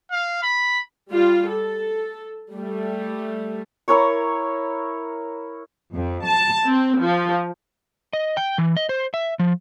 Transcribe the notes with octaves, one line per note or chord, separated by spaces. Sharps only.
F5
B5
G3 F4
A4
G3 A3
E4 A#4 C#5 C#6
F2
A5
C4
F3
D#5
G5
E3
D#5
C5
E5
F3